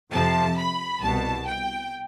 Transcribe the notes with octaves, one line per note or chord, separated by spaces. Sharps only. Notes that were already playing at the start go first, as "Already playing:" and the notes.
F2 C3 F3 A5
B5
C2 B2 A5
G5